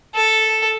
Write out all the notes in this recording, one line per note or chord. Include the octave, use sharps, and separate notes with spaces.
A4